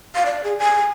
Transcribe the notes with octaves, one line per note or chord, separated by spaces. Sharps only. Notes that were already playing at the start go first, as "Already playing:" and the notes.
F5
D5
G#4
G#5